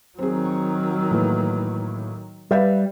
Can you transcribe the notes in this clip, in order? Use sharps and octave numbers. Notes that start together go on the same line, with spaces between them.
D#3 F#3 C4 G#4
A2 E3 A#3
G3 B4 E5 F5